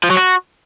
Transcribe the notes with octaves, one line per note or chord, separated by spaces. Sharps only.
F3
F#3
F#4